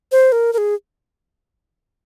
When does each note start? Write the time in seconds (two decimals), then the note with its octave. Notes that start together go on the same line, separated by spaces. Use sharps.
0.12 C5
0.32 A#4
0.53 A#4
0.58 G#4